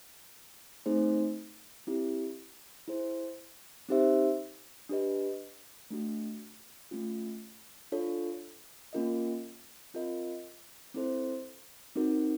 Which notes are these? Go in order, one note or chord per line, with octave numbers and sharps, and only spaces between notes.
A3 C4 D#4 G#4 C5
C4 E4 G4
E4 G#4 C5
C4 D#4 G4 C5 E5
D4 G4 B4 D#5
A3 D4 F#4
A3 C#4 F4
D4 F4 A4 C#5
A#3 C#4 F4 A#4 D#5
C4 F4 A#4 D#5
C4 E4 A4 C5
C4 D#4 F#4 A#4